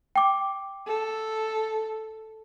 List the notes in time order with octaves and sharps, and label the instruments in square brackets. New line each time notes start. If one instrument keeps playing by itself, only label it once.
[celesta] G5 D6
[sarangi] A4